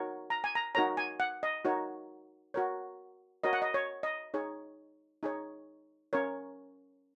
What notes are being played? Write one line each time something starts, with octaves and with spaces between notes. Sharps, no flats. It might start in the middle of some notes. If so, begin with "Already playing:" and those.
Already playing: D#4 F#4 A#4 C#5
A#5
G#5
A#5
D#4 F#4 A#4 C#5 A#5
G#5
F#5
D#5
D#4 F#4 A#4 C#5
F#4 A#4 C#5
F#4 A#4 C#5 D#5
F#5
D#5
C#5
D#5
D#4 G#4 C#5
D#4 G#4 C#5
C#4 A#4 C#5